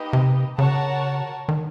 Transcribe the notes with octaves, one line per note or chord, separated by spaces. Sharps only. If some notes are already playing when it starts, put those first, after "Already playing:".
Already playing: A#3 D#4 G4 B4 D#5
C3
C#3 F#4 A#4 C#5 F#5 A5
D#3